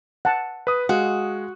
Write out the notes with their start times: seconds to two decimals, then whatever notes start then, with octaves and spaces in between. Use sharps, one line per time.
0.25 F#5 A5
0.67 B4 D#6
0.89 G#3 F#4 F5